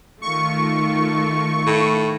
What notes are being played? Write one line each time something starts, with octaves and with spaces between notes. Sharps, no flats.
D#3 A3 F4 C#6
A2